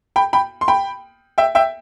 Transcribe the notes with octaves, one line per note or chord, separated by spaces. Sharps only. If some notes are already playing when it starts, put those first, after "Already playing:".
G5 B5
G5 B5
C6
G5 B5
E5 G5
E5 G5